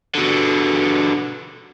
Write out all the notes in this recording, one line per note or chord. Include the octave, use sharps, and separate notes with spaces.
B2 D3